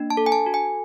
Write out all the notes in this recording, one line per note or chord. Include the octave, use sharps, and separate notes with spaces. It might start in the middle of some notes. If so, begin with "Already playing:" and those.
Already playing: A#3 D4
A5
A4
G#5
A5
F#4
G#5